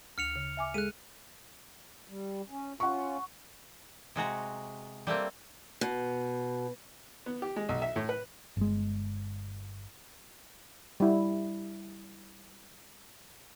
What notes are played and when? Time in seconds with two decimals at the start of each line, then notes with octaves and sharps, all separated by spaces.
0.18 D2 F6 C#7 F7
0.36 C#3
0.57 E5 G#5 D6
0.74 G#3 G#4 A4 F#6 D#7
2.08 G3
2.50 C#4
2.80 C#4 F4 F#5 C#6
4.16 C3 G#3 F#4 A#5
5.07 G3 A3 A#3 C4
5.81 B2
7.26 B3
7.42 G4
7.56 G#3
7.69 B1
7.82 E5
7.96 A2
8.09 B4
8.57 G1 G#3
11.00 G3 E4